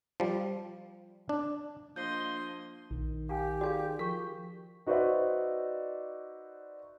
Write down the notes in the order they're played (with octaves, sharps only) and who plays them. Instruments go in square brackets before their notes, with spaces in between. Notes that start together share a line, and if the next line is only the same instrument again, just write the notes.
[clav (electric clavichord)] F3 G3
D4
[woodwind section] F3 A#3 D4 [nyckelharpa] D#5 C6 [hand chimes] G6
[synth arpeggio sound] A#1 [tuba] D#3
[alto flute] G4 [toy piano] F5 G5 G#5
[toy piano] F#4 G#4 F5 [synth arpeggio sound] D5 G5
[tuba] F3 [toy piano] A#4 C#6 [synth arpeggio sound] B6
[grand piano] D#4 F#4 B4 C5 D5 E5